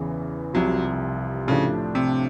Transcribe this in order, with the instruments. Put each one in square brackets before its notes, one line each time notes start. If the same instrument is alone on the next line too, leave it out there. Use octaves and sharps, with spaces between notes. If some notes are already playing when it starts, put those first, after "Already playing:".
Already playing: [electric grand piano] E2 C#3 E3
[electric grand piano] C2 C3 F3 [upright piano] F#3
[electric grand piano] A2 F3 A3 D4 G4 [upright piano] C#3
[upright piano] C3